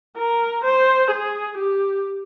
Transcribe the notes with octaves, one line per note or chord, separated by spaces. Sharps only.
A#4
C5
G#4
G4